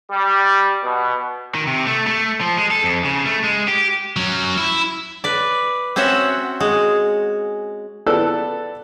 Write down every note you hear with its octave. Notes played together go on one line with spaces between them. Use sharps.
G3
B2
D#3
C3
A3
A3
F3
G#3
A4
F2
C#3
A3
G#3
G4
F#3 C#4
E4
B4 D5
C4 C#4 F#4 C5 E5 F#5
G#3 F#4
B3 A4 D5 E6 F#6